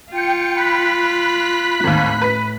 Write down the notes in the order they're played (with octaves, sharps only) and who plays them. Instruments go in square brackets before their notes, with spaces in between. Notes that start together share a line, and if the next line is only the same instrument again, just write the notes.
[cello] F4 [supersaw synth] G5 C#7
[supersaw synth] B5 F#6 B6
[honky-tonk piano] G#1 D#2 [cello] A2
[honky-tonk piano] B4 B6